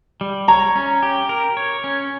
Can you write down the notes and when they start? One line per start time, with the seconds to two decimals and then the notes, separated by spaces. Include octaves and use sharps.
0.21 G3
0.48 C#5 A#5
0.76 C#4
1.03 G4
1.29 A#4
1.57 C#5
1.84 C#4